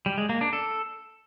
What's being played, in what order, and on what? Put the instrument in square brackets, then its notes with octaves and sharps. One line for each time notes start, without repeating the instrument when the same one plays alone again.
[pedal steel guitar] G3
G#3
A#3
D4
A4